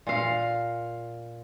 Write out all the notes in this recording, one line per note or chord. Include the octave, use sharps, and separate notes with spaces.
A#2 F5